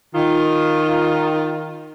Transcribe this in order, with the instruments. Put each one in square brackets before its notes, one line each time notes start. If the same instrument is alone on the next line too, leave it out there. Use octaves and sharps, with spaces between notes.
[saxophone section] D#3 F4